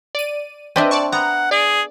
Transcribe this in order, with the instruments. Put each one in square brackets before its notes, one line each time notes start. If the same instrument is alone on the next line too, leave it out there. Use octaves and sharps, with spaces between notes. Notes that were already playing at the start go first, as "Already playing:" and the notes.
[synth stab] D5 D#7
[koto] C4 D4 E5 [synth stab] B4 D#5
[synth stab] D5 A5 C#6
[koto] B3 [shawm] F#5 [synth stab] A#5
[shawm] G#4 [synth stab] D5